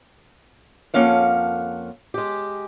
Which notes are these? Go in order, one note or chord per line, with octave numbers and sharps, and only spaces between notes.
F2 A#3 C#4 F5 F#5
G#3 G4